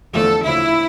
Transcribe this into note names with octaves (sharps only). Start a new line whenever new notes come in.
E2 D3 F3 A3 A4
D2 C#3 F3 E4